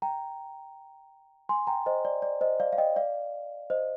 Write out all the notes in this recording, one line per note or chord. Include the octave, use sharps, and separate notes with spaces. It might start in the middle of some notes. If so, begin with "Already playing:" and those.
G5 A#5
G#5 C6
G5 A#5
C5 D#5
D5
D5
C5 D#5
D5 F5
F5
D#5 G5
D5 F5
C5 D#5